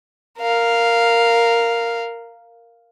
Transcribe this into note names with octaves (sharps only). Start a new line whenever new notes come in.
A#4 F5